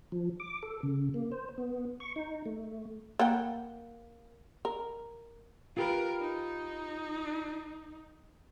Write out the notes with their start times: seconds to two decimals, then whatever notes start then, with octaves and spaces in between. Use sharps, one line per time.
0.12 F3
0.40 D6
0.63 A4
0.83 C#3
1.14 A#3
1.32 C5
1.58 B3
2.00 C#6
2.16 D#4
2.46 A3
3.19 A#3 F#5 G5
4.65 A#4
5.77 F4 G4 A#4 B4
6.21 D#4